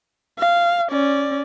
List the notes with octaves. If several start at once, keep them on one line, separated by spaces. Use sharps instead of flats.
F5
C#4 D5